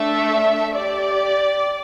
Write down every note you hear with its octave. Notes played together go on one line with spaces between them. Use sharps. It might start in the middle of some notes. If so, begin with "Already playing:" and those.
Already playing: A3 D4 A4 E5
G4 D5